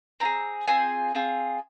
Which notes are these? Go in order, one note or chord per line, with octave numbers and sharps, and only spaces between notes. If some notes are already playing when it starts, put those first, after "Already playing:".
C4 F4 G#4 A#5
C4 F4 G#4 G#5
C4 F4 G#4